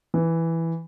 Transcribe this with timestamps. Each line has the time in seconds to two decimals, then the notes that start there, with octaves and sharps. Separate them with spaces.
0.14 E3